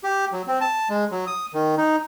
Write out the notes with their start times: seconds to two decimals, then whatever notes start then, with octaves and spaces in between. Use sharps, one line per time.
0.04 G4
0.33 F#3
0.47 C4
0.61 A5
0.89 G#3
1.11 F#3
1.27 D#6
1.54 D#3
1.77 D#4